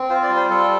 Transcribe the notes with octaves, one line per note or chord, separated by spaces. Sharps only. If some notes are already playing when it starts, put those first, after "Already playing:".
Already playing: C4
F4 C5
D5
G3
C5
G3 A4